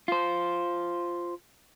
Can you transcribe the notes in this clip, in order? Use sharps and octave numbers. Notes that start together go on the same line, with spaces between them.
F4 C5